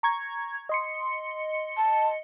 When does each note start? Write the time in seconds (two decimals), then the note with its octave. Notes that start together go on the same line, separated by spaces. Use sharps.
0.03 A#5 C#6 G#6
0.69 D#5 C6 C#7
1.77 A5